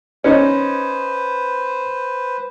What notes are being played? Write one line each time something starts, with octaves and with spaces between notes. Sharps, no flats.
C#4 D#4 B4 C5